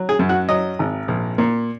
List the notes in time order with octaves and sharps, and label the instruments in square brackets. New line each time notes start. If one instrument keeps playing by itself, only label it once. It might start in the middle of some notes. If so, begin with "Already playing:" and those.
Already playing: [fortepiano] F#3
G#4
F#2
F#4
F#3 D#5
G#1
A#1
A#2